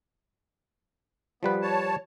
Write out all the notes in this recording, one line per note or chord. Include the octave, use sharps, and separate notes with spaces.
F3 G3 B3 B4
C#5 A5